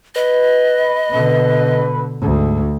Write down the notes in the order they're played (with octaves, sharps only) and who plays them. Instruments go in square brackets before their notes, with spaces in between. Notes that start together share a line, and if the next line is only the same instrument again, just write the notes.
[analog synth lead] B4 [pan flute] D#5
[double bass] B2 D3
[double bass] D2 [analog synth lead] G#2